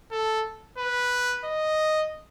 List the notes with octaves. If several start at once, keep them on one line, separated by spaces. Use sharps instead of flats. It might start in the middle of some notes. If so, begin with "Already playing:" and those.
A4
B4
D#5